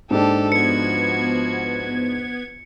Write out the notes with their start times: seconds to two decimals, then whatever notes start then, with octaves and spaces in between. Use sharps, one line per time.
0.11 G#2 A#3 D4 G4 A4
0.52 F3 B3 F#4 G#6 C#7